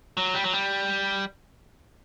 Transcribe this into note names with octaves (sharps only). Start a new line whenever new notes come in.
F#3
G3
F#3
G3